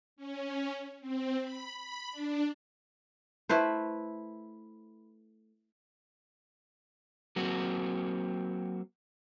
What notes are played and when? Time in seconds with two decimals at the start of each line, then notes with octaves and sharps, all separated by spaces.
0.16 C#4
1.00 C4
1.42 B5
1.77 B5
2.11 D4
3.49 A3 E4 B4 C5
7.36 F#3 A#3 C4 F#4